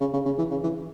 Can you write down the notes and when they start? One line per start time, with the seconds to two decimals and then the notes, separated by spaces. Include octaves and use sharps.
0.01 C#3
0.13 C#3
0.25 C#3
0.38 E3
0.51 C#3
0.64 E3